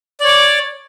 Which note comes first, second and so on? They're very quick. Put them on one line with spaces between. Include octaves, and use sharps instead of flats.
D5 C#5 D6